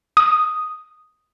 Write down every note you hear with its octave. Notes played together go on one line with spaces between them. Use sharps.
D#6